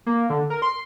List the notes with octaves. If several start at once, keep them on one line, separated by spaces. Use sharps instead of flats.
A#3
D3
A#4
C6